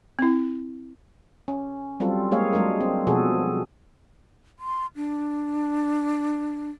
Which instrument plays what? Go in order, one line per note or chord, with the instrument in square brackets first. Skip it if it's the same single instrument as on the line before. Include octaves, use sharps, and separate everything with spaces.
[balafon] C4 E4
[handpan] C#4
F#3 G3 C4 F4 A4
G#3 A#3 G#4 C#5 F5
F#3 G#3 D4 A#4
C4
B2 F3 F#4 G#4 A4
[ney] C6
D4